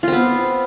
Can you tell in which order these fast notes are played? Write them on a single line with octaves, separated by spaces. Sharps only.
F4 C4 B3